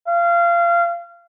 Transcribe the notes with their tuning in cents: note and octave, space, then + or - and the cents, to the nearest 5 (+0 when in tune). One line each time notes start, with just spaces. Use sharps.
F5 -25